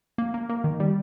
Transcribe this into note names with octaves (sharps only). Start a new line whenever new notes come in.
A#3
A#3
A#3
D#3
G3